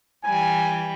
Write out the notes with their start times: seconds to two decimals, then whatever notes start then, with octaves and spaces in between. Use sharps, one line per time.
0.24 E3 G3 G#5